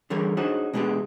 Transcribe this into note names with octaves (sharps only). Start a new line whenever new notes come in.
D3 E3 G3 G#4 A#4 C#5
D4 D#4 F#4 G#4 C5 C#5
B2 G#3 B3 D4 G4 G#4